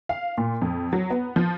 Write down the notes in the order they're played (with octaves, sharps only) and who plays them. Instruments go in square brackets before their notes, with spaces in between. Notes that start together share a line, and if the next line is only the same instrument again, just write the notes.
[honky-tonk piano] F5
A#2
F2
F#3
B3
F3